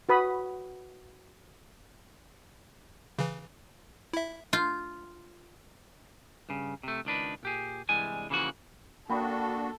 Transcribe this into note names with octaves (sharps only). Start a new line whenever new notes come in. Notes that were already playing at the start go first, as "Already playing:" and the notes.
F#4 B4 B5 D#6
C#3 E3
E4 E5
F4 G6
G2 C#3
C3 A3
C#2 D#3 D4 B4
A#2 G4 G#4
C2 G2 E3 G3 G#3 G#5
C#3 E3 F3 A#3 F#4
A#3 D4 F#4 A4 G5 B5 D#6